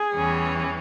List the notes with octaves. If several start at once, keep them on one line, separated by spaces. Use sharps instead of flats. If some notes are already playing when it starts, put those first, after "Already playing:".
Already playing: G#4
E2 E3 G3 C#4